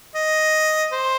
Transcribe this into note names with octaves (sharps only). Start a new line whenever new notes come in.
D#5
C5